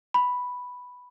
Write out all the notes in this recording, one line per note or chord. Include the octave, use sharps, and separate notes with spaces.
B5